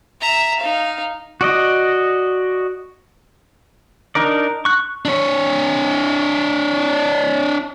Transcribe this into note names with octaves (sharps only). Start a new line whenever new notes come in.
E5 A#5
D#4 F5
F#4 D5 D#5
D4 D#4 A#4 D5
C#6 F#6
D4 C#5